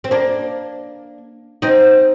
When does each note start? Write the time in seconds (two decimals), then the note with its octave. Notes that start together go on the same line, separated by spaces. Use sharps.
0.04 C4
0.11 A#3 D4
1.62 C4 D#4